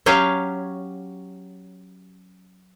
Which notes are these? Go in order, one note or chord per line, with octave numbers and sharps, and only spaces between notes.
F#3 C#4 G4 C#5 F5